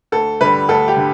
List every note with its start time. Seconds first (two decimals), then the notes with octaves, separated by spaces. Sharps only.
0.12 D2 A4
0.41 D3 G3 B4
0.69 D2 A4
0.88 G4
0.97 D3